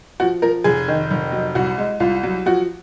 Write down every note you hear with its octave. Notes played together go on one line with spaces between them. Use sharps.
F3 F#4
F3 A#4
F1 G#4
D#3
F1
F#3
C2 F#4
G#3
C2 F4
F#3
F3 F#4